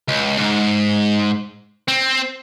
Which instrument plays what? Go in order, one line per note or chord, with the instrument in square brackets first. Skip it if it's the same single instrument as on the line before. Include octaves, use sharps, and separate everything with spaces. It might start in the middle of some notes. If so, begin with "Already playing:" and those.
[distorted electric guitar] C#2
G#2
C4